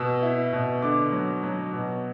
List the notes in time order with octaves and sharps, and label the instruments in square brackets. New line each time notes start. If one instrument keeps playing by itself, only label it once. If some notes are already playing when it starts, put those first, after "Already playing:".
Already playing: [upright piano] B2 E6
E4
B2
D3 D6
F#3
F#3
B2